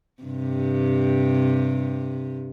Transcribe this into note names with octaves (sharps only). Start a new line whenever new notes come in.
G2 C3